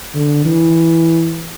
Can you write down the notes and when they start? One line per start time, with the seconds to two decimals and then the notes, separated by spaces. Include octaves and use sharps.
0.14 D3
0.45 E3